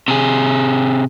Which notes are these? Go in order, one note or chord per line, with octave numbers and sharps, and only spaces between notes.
C3 G#4